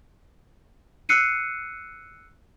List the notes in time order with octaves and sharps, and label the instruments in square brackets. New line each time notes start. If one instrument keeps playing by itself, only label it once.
[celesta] E6 F#6 C7 C#7 D#7